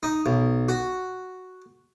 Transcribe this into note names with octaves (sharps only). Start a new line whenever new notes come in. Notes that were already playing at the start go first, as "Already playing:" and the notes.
D#4
B1
F#4